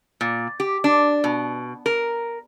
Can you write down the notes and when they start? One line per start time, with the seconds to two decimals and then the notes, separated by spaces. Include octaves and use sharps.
0.21 A#2
0.60 G4
0.84 D4
1.24 B2
1.86 A#4